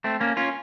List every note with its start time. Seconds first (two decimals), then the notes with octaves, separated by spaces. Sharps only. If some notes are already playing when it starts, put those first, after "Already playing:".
0.04 A3 C4
0.20 A#3 C#4
0.37 C#4 F4